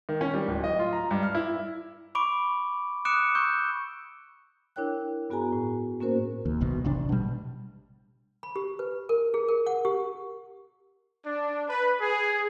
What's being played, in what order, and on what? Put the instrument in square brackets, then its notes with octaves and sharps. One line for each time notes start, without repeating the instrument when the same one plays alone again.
[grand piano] D#3
C#4
G3
D1
D#5
F4
A#5
G2
F6
E4
[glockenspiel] B5 C#6 D6 D7
D6 D#6 F#6 C#7 D7 E7
C#6 E6 G6
[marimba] D4 E4 A#4 C#5 G5 F#6
G2 B3 F#4 G#4 G#5 A#5
A2
A#3 C#4 F#4 A#4 C5
[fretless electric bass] D#2
F1 C2 B2
A1 C3 D4
B2 G3
[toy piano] B5
G4
B4
A#4
G#4
A#4
F#5
G4
[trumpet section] D4
B4
G#4